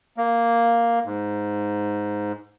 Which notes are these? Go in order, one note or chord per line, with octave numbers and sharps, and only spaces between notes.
A#3
G#2